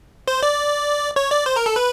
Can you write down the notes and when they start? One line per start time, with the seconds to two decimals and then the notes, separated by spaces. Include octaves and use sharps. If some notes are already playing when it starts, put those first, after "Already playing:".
0.28 C5
0.43 D5
1.16 C#5
1.31 D5
1.46 C5
1.56 A#4
1.66 A4
1.76 B4